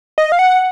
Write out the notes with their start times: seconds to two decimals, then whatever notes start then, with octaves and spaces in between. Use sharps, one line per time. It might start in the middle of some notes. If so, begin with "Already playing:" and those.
0.18 D#5
0.32 F5
0.39 F#5